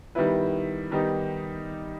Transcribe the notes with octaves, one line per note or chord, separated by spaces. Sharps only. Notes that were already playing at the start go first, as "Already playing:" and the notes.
D#3 G3 B3 E4 B4
D#3 G3 B3 D#4 G4